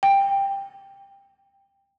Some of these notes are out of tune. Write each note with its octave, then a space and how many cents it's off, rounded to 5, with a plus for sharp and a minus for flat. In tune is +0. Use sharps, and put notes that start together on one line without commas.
G5 +10